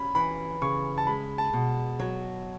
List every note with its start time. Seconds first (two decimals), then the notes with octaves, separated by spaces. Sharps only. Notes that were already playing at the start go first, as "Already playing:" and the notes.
Already playing: C#4 B5
0.15 E3 B5
0.62 C#3 C#6
0.98 A5
1.07 G#3 B5
1.38 A5
1.53 B2
2.00 F#3